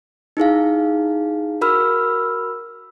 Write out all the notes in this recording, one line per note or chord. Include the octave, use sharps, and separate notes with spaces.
D#4 E4 G#4 F5
F#4 A#4 B5 E6 F6